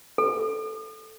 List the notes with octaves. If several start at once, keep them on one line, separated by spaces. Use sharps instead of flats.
A4